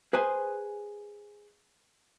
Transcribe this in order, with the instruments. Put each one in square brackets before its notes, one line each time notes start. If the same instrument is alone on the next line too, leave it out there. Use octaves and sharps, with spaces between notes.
[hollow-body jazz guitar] G#4 B4 C5 G#5